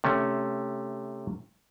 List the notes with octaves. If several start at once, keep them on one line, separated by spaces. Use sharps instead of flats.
C3 A3 C#4